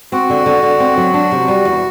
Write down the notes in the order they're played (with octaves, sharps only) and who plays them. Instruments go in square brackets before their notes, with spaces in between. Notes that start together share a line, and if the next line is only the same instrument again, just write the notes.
[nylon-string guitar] C4 [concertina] F#4
[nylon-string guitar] D3
D3
D3
C4
F#3
D4
C3
G3
E2